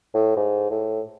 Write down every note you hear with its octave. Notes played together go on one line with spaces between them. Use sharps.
A2
G#2
A2